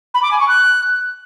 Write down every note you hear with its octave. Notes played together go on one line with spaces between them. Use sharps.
B5
D6
G#5
C#6
F#6